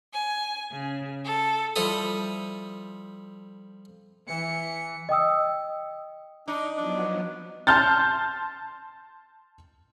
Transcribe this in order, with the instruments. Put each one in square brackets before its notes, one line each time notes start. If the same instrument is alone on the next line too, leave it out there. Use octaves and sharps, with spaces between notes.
[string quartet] G#5
C#3
A4
[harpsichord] F3 G3 E4 A4 D#6
[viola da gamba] E3 [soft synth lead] C#7
[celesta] D#5 G5 D#6 E6
[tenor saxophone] D4 [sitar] D#4
[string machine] F3 F#3 B3 [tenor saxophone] D4
[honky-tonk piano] A5 C6 F6 G6 A6